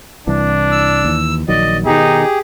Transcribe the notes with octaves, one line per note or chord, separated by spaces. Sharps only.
C2 E3 D4
E6
D#2 E3
A#1 D#3 F#3 D5 D#5
B2 D#3 D#4 G4 G#4